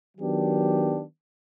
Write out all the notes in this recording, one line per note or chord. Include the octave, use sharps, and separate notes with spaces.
D#3 F#3 B3 D4 G4